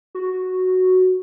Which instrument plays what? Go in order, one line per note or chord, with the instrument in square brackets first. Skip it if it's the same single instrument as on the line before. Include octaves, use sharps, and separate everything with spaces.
[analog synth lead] F#4